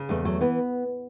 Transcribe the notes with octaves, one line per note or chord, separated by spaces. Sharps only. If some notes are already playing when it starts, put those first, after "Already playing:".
Already playing: C#3
E2 A3
F#3 A3
E3 B3